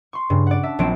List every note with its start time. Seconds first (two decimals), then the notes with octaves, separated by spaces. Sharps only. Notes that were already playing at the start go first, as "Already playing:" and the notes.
0.13 C6 C#6
0.30 G2 C#3
0.47 D5 F#5
0.63 E5 A5
0.79 A#1 F#3 C4 D7 E7